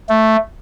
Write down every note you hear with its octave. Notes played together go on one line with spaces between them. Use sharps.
A3